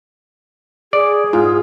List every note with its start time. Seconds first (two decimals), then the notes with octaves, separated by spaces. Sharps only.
0.93 G#4 D5
1.33 G#2 F4